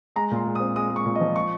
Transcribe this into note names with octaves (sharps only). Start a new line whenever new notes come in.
G#3 A#5
A#2 C6
G#3
D#6
C4
G#3 D#6
G#3
C#6
A#2
D#5
F3
C#6